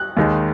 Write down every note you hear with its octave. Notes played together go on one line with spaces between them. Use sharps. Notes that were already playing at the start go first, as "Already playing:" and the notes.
Already playing: F#6
D#2 D#3 G#3 D#4